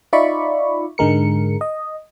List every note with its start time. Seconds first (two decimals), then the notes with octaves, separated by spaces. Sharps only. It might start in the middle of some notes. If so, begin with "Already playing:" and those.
0.13 D#4 F4 D5 E5 B5 C#6
0.98 G#2 D3 G#3 A#4 C#7
1.61 D#5